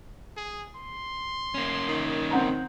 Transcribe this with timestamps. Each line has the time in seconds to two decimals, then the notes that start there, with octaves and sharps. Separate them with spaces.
0.36 G#4
0.75 C6
1.54 A#3 C#4
1.88 D#3
2.31 C4 F#5 A#5